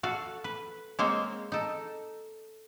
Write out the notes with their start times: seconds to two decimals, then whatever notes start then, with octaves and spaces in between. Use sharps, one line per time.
0.03 F#4 A4 F5
0.44 B4
0.99 G#3 A#3 C4 C5 C#5
1.52 D#4 A4